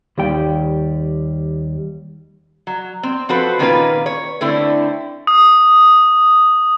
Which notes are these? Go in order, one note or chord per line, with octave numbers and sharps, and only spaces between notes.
D#2 G3 G5
F#3
C4
F3 C4 F#4 A4 B4 C5
A#2 D#3 A#3 C#4 F4 B4
C#5
D3 A3 C4 E4
D#6